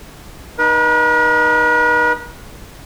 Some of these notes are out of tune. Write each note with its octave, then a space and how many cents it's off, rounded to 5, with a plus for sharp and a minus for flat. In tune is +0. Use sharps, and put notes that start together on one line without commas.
D#4 -15 B4 -45